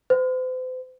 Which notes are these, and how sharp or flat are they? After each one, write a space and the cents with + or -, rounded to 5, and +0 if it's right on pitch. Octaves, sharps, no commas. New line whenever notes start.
C5 -40